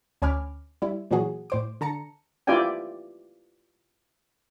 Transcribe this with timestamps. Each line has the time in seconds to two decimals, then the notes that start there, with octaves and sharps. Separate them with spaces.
0.22 D2 C#4 G#5 B5 D6 F6
0.82 G3 E4
1.11 A#2 E3 F#3 F#4 G#4
1.50 A2 C5 D6
1.81 D3 A5 A#5 C#7
2.47 E4 F4 G4 D5 G5 G#5